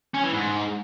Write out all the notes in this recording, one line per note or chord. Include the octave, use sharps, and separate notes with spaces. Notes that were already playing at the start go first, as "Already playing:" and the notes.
C#4
E3
G#2